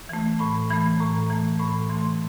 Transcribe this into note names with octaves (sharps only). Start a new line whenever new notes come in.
E3 A3
A2 B5
E3 A3 B5
A2 A#5
E3 A3
A2 B5
E3 A3 C6